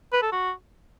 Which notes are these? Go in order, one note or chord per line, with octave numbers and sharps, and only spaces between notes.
B4
A4
F#4